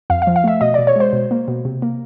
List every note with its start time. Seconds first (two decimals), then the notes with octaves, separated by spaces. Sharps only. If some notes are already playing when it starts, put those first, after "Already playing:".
0.10 F2 F5
0.22 F5
0.27 F3
0.36 F5
0.44 A3 E5
0.61 B2 D#5
0.74 B2 D5
0.87 C#5
0.96 G#3 C5
1.13 B2
1.31 A#3
1.48 B2
1.65 C3
1.82 A#3